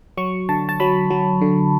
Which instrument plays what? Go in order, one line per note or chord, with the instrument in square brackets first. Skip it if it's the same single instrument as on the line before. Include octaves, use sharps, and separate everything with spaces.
[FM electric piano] F#3 C#6
D3 A5
A5
F#3 B5
F#3
D3